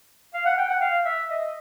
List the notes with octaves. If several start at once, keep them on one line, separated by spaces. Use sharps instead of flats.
F5
F#5
G5
F#5
F5
E5
D#5